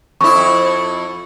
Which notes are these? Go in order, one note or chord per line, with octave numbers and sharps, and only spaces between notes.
F2 E4 C#6